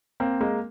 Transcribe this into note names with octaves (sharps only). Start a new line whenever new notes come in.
A#3 C4
G#3 A#3